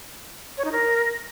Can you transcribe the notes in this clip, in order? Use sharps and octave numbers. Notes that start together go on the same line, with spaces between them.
C#5
D#4
A#4